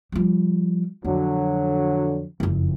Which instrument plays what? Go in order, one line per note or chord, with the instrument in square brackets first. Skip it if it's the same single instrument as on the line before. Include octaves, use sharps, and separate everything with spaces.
[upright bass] F3 G3
[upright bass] F2 [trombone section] D3 F#3
[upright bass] F#1 F2